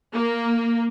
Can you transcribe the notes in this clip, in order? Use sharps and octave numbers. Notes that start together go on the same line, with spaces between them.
A#3